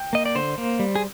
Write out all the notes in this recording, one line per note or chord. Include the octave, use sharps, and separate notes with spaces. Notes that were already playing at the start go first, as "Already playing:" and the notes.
Already playing: G5
A#3 D#5
D5
D3 C5
A#3
G3
G#4